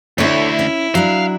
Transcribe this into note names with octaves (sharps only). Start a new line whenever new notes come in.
D2 D3 E4 C#5
C#4
F#3 D4 F5